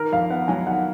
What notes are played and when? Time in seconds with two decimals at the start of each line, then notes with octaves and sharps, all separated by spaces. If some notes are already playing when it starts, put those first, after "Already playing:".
Already playing: D#3 A#4
0.12 F2 F5
0.30 B3 F#5
0.48 F#3 G#5
0.67 D#3 F#5